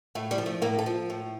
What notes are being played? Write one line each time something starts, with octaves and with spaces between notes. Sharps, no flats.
A2 A3
G3
F3
A3
A2 A#3
A4
F3
A2